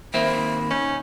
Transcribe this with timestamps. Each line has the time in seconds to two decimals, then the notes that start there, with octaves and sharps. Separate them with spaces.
0.14 D#3 A#3 C4 C5 E5 B5
0.70 C#4 D#4